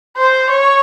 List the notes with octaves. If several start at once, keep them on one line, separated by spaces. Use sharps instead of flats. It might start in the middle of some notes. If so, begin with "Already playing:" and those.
C5
C#5